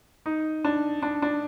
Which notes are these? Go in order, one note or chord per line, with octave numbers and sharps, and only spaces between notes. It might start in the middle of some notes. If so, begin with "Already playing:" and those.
D#4
D4
D4
D4